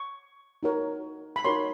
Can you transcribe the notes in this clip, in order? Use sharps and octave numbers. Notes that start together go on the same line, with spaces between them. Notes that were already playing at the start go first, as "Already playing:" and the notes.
Already playing: C#6
D#4 F#4 A#4 C#5
B5
D#4 F#4 A#4 C#5 C6